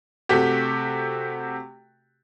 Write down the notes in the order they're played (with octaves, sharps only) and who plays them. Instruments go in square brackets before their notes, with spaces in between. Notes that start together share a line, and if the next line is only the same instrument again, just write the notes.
[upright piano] C3 A3 F#4 G4